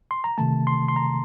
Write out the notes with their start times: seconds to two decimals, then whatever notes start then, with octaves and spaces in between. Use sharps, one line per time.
0.11 C6
0.24 A#5
0.38 C3 D#3 A3 A5
0.67 C6
0.88 C6
0.96 A#5